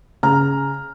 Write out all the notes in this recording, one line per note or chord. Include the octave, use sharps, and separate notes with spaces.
C#3 A#5 F6